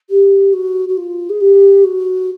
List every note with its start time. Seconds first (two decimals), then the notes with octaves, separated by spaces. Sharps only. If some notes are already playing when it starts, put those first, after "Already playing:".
0.10 G4
0.53 F#4
0.88 F#4
0.97 F4
1.29 G#4
1.40 G4
1.84 F#4